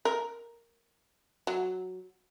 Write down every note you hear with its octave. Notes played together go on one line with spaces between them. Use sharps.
A#4
F#3